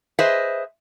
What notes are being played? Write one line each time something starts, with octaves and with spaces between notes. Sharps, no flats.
G#4 B4 C5 D#5 E5